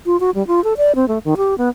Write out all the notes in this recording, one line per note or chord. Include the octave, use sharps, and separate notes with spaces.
F4
F#4
G3
F4
A4
D5
C4
A3
D#3
G4
B3